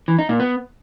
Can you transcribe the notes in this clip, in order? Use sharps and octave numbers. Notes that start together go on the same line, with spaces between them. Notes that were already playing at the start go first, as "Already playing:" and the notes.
E3
D#4
A#2
B3